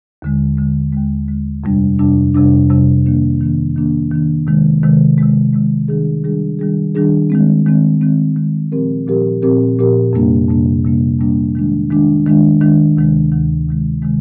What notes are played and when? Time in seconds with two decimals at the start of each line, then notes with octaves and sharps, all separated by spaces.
0.22 D#2 D3 G#3
0.58 D#2 D3 G#3
0.93 D#2 D3 G#3
1.28 D#2 D3 G#3
1.64 F2 C3 G3 D4
1.99 F2 C3 G3 D4
2.35 F2 C3 G3 D4
2.70 F2 C3 G3 D4
3.06 D#3 A#3 D4
3.41 D#3 A#3 D4
3.76 D#3 A#3 D4
4.12 D#3 A#3 D4
4.47 C3 D#3 G#3
4.83 C3 D#3 G#3
5.18 C3 D#3 G#3
5.53 C3 D#3 G#3
5.88 D#3 G3 D4 G#4
6.24 D#3 G3 D4 G#4
6.59 D#3 G3 D4 G#4
6.95 D#3 G3 D4 G#4
7.30 D#3 G#3 C4
7.66 D#3 G#3 C4
8.01 D#3 G#3 C4
8.36 D#3 G#3 C4
8.72 A#2 F3 C4 G4 A#4
9.07 A#2 F3 C4 G4 A#4
9.42 A#2 F3 C4 G4 A#4
9.79 A#2 F3 C4 G4 A#4
10.13 F2 C3 G3 A#3 D4
10.49 F2 C3 G3 A#3 D4
10.84 F2 C3 G3 A#3 D4
11.19 F2 C3 G3 A#3 D4
11.55 D#3 G#3 D4
11.91 D#3 G#3 D4
12.26 D#3 G#3 D4
12.61 D#3 G#3 D4
12.97 D2 C3 D#3 G#3
13.32 D2 C3 D#3 G#3
13.68 D2 C3 D#3 G#3
14.02 C3 D#3 G#3